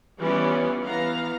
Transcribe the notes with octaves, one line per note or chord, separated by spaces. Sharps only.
E3 G3 B3 C#4 F4 D5
E3 B3 F5 A#5